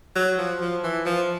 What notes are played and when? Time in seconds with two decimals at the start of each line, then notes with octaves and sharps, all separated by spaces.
0.15 F#3
0.38 F3
0.61 F3
0.83 E3
1.05 F3